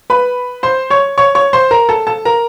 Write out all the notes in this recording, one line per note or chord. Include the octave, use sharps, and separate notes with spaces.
B4 B5
C5 C6
C#5 C#6
C#5 C#6
C#5 C#6
C5 C6
A#4 A#5
A4 A5
A4 A5
A#4 A#5